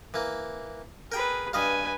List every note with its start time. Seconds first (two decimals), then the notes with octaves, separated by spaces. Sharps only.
0.14 E3 A#3
1.12 G#4 A#4 B4 G5
1.53 G2 B4 D#5 F5 G#5